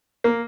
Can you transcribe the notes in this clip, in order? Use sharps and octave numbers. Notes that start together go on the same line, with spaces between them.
A#3